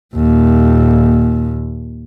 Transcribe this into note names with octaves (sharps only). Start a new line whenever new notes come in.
D#2 A#2